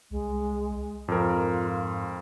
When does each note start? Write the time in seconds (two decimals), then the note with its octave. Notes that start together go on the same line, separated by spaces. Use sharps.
0.11 C2 G#3
1.08 F2 G#2 F4 A#4